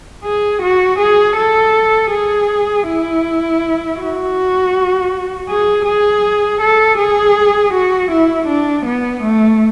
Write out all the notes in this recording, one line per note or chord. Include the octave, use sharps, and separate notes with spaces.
G#4
F#4
G#4
A4
G#4
E4
F#4
G#4
G#4
A4
G#4
F#4
E4
D4
B3
A3